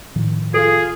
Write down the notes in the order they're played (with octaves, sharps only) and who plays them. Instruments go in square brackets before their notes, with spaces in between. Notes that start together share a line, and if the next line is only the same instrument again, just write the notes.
[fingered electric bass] A2 D#3 F3
[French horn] F4 [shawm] G#4 [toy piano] A4